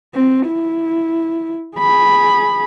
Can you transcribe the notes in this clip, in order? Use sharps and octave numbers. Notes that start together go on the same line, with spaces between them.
C4
E4
G#4 B5